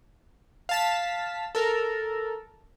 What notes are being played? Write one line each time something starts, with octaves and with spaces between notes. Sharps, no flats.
F5 A5 B6
A4 A#4